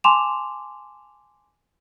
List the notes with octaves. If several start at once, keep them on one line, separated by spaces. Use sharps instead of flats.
G#5 A5 C6 D6 E7 F7